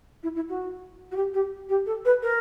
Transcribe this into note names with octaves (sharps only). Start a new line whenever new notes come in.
E4
E4
F#4
F#4
G4
G4
G4
A4
B4
A#4